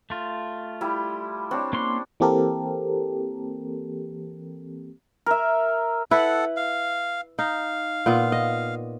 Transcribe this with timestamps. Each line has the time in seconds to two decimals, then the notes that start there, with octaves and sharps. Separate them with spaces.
0.10 A3 F4
0.81 G3 E4
1.51 C4 D4 C#5
1.73 A#3 C#4 C6
2.20 E3 A#3 C4 G4 A4 A#4
5.26 A#4 E5
6.11 E4 A4 B4 F#5
6.56 F5
7.39 D#4 F5
8.06 A#2 B3 F4
8.32 D#5